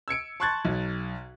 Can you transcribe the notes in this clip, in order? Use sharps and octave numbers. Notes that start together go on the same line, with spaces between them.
E6 G#6 C#7 D7
A5 C6 C#6 F#6 G#6 A6
B1